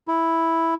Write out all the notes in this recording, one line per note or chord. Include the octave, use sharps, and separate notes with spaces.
E4